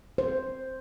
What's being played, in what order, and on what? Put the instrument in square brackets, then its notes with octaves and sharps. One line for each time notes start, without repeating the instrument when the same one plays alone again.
[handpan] C5